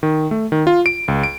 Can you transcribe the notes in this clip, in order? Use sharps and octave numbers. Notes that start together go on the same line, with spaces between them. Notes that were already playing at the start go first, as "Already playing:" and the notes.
D#3
A3
D#3
F4
D7
C#2
D7